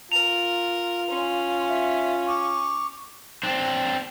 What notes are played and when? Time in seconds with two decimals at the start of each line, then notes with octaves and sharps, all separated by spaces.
0.12 F4 A#4 F7
1.10 C#4 C6
1.69 E5
2.26 C#6 D6
3.43 C4 D4